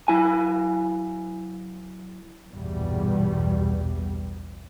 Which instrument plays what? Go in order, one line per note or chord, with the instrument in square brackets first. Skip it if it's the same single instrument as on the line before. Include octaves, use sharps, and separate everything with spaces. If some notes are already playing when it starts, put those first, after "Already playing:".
[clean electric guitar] F#3 E4 G#5
[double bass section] A#1 E2 G2 B2 G3